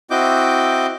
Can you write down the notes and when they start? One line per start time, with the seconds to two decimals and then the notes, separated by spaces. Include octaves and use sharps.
0.10 C4 E4 F#4 D#5 D6 G6